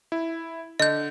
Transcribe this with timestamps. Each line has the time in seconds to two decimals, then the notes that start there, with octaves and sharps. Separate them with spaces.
0.12 E4
0.80 D3 D#5 G6